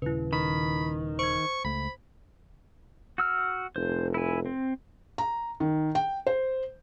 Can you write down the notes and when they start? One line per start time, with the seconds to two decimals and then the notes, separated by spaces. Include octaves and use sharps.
0.02 D#1 C#3 E4 B4
0.33 D#3 B5
1.19 C5 C#6 G#6
1.65 C#2 A3 B5
3.18 F#4 E6 F6
3.76 F1 C5
4.14 E4 G#5
4.46 C4
5.18 A#5
5.60 D#3
5.95 G5
6.27 C5